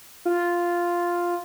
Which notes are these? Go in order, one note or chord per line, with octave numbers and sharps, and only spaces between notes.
F4